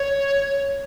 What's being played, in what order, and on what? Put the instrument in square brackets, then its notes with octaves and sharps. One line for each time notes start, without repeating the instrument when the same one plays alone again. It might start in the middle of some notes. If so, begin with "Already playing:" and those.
Already playing: [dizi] C#5